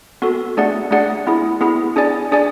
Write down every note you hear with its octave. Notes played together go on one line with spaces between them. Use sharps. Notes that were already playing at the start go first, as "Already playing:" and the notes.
B3 F#4 A4
A3 D4 G#4 D5 F#5
A3 D4 G#4 D5 F#5
B3 E4 G#4
B3 E4 G#4
D4 G#4 D5 G#5
D4 G#4 D5 G#5